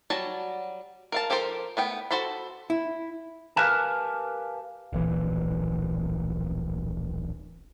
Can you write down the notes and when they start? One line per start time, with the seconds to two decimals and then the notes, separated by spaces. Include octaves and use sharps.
0.10 F#3 G3 F#4 A5
1.12 A#4 F5 A5
1.30 F3 G4 A4 A#4 C5
1.77 A3 B3 G5
2.11 F#4 A4 C5 A5 B5
2.70 E4
3.56 G4 A#4 B4 F5 G#5 A5
4.93 D1 A#1 E3